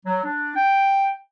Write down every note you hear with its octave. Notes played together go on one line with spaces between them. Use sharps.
F#3
D4
G5